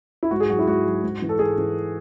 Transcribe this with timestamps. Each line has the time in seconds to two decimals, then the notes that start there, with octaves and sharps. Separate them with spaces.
0.23 E4
0.31 G#2 F#4
0.40 G#4
0.50 F#3 F#4
0.59 E4
0.67 G#2 F#4
0.85 F#3
1.04 G#2
1.22 E3
1.29 A4
1.39 G#2 G#4
1.58 E3